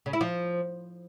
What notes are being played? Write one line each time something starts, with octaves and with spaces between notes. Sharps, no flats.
C#3
E4
F3